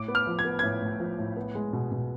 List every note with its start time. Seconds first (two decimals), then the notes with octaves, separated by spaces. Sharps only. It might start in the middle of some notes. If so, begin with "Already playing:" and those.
Already playing: A2 D6
0.08 B3
0.15 F6
0.27 F3
0.39 G#6
0.45 B3
0.59 A2 G#6
0.82 A2
1.00 F3
1.18 A2
1.37 B3
1.55 G#3
1.73 B2
1.91 B2